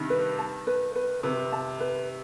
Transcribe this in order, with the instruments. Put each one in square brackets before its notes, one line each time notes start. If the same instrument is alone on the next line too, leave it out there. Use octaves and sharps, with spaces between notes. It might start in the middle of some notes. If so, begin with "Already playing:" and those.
Already playing: [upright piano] G2 C3 D#3
[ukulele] B4
A5
B4
B4
[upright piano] C3 [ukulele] B4
[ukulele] A5
B4